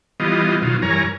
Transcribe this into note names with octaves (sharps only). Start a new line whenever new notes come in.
E3 G3 B3 F4 D#5
B2 D#3 F#3 F4
G2 E3 A#4 C#5 G#5 A#5